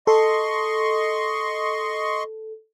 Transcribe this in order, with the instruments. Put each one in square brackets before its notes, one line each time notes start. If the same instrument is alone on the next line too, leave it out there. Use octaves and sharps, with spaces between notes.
[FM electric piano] A4 [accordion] D#5 C6 C#6